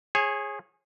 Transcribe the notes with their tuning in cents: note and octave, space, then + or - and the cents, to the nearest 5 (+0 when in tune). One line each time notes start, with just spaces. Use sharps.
G#4 -5 C#5 -30